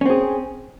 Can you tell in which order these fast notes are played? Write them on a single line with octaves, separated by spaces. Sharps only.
C#4 C4 G#4